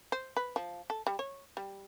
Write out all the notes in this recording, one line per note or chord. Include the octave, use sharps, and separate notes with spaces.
C5
B4
F3
A4
G3
C#5
G3